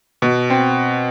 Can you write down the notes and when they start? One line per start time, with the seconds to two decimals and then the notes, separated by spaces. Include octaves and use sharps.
0.22 B2
0.50 C4